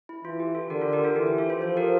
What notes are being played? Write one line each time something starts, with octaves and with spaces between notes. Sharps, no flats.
E4
E3 F4
G4
F4 A4
D3 G4 A#4
F4 A4
G4 A#4
F4 A4
E3 G4
G4
F4 A4
A4 C5
F3 A4 C5
G4 A#4